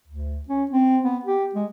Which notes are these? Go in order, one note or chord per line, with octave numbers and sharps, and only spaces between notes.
D2
C#4
C4
B3
G4
G#3